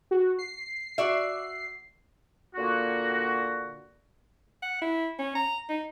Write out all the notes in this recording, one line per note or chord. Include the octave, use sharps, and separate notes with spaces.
F#4
C7
F#4 D5 E5
A#2 D3 A#3 F#4
F#5
E4
C#4
A#5
D#4